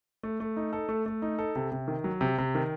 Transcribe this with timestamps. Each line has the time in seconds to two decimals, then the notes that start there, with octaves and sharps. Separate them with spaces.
0.23 A3
0.40 A3
0.57 D#4
0.73 A4
0.89 A3
1.06 A3
1.22 D#4
1.38 A4
1.55 C3
1.72 C3
1.88 D#3
2.04 F#3
2.21 C3
2.38 C3
2.55 D#3